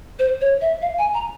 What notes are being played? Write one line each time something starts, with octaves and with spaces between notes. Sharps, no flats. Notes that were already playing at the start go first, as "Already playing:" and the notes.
C5
C#5
E5
F5
G#5
A#5